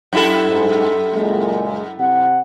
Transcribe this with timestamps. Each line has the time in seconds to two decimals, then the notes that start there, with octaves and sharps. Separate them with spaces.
0.13 F#2 E4 A4
0.49 G#2
1.13 F#1 A#2 G#3
1.99 C3 F#5